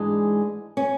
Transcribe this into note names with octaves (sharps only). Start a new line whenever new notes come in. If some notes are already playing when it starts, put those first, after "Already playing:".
Already playing: G#2 E3 G#3 D4
C#4